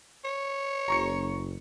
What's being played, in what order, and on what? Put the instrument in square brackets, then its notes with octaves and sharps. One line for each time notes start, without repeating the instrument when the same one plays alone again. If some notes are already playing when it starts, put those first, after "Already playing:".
[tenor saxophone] C#5
[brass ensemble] F#1 [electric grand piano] A#5 C#6 C#7